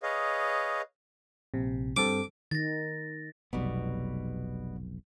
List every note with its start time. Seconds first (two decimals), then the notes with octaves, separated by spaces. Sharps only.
0.03 G#4 B4 C#5 D#5 F5
1.54 A#1 C3
1.97 G2 C4 A4 D6
2.51 D#3 A6 A#6
3.53 F1 B1 B2 G3 B3